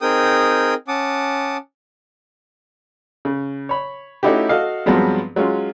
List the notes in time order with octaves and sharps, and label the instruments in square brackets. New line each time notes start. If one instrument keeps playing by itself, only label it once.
[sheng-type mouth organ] C4 D#4 G#4 A#4 G5 D#6
C#4 F#5 A5 D6 D#6
[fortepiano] C#3
C#5 B5
A3 C#4 D#4 E4 F#4 G4
F#4 A4 D#5 F5
G2 F3 F#3 G#3 B3 C4
F#3 G#3 C#4 F4